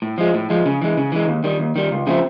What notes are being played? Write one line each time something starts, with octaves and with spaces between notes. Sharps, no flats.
A2
F3 G#3
A2
F3 G#3
C#3
E3 G#3
C#3
E3 G#3
D#2
D#3 G3
D#2
D#3 G3
C#2
C#3 F3 A3 C4